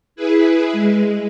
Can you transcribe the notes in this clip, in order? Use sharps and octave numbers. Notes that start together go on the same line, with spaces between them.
E4 G#4 B4
G#3